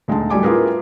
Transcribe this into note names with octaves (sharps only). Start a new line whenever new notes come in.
D2 G#3 D#4 A5
A2 F#3 G3 G#5 D6
E4 F4 G#4 A#4 B4